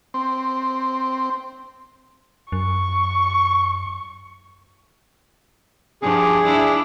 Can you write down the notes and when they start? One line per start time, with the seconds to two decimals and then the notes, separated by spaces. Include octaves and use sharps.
0.14 C4
2.52 F#2 C#6
6.02 G2 F3 G3 G#4
6.45 D4 E4 F4